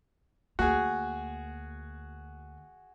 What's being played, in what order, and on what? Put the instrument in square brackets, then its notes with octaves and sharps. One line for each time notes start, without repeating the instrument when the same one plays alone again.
[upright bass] D2 A#3 [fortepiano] F#4 G#4